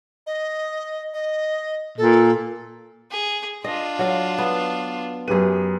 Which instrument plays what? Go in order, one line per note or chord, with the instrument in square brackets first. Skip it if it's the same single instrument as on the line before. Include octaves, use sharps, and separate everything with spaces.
[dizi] D#5
D#5
[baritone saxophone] A#2 [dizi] A4
[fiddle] G#4
[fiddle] D4 F4 [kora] D#5
[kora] F#3 F5
B3
[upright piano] F#2 G4 D#7 [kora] G#4 B4